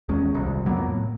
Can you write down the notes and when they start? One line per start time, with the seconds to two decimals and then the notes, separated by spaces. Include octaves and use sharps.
0.09 D#1 E2 G#3 C#4
0.34 D#1 C2
0.66 F2 F#3 A#3 B3
0.88 A2